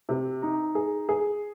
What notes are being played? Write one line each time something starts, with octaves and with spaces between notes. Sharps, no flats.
C3
D#4
G#4
G#4